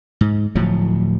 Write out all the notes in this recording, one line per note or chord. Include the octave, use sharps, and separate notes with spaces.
G#2
D1 A2 F3 F#3